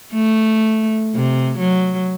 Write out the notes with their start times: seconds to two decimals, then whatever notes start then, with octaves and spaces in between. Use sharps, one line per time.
0.14 A3
1.15 C3
1.59 F#3